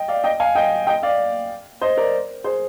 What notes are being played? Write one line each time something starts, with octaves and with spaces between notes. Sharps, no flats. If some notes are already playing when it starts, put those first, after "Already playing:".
Already playing: D#5 G5
D5 F5
D#5 G5
F5 G#5
D#5 G5
D#5 G5
D5 F5
C5 D#5
A#4 D5
G#4 C5